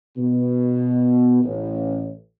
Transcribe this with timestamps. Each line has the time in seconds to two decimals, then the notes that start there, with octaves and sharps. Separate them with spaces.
0.17 B2
1.43 A1